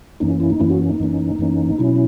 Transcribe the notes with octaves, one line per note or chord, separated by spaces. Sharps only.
F#2 E3 A#3 C#4 D#4
E4
D#4
F#2 E3 A#3 C#4 E4
F#4
D#4
F#2 E3 A#3 C#4
F#2 E3 A#3 C#4
B2 F#3 C#4 E4